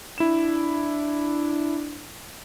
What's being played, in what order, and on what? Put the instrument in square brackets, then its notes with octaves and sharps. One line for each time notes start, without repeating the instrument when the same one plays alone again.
[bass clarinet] D4 [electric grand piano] E4 E7